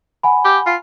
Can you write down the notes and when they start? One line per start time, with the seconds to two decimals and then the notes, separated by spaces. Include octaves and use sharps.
0.23 F#5 G#5 B5
0.45 G4
0.66 F4